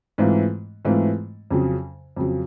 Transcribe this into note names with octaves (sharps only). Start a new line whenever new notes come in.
G#2 E3 A3 C4 F4
G#2 E3 A3 C4 F4
F2 C#3 F#3
F2 C#3 F#3